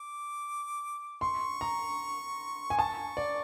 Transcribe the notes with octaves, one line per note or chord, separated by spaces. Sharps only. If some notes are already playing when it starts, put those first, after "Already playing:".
Already playing: D6
C6 C#6
A#5
G#5
A5 C#6
D5